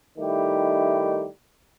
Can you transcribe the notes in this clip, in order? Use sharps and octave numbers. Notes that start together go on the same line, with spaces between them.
D#3 G3 A3 D#4 E4 G4